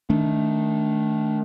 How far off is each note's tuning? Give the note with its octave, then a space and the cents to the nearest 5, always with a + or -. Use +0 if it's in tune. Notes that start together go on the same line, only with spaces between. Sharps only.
D#3 +0 A3 -15 D4 -20